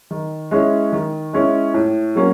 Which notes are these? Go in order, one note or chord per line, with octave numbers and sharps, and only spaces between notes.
D#3
G#3 C#4 E4
D#3
G#3 C#4 E4
A2
F#3 A#3 C#4